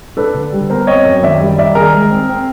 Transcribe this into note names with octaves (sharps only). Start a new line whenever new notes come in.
D4 A4 B4
D3
G3
B3 A#4 C5
C4 C#5 D#5
F#2
D#3 D5 E5
G3
D#4 D5 E5
D#3 G#4 A#4
G#3
C4
C4